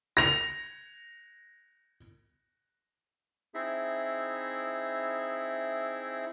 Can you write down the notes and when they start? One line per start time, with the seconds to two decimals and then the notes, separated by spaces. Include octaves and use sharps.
0.17 A#6 F7
3.54 C4 D#4 E4 G#4 E5